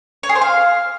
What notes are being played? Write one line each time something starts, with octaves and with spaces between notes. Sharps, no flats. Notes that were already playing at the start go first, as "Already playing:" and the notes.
C#5
G#4
C5
F5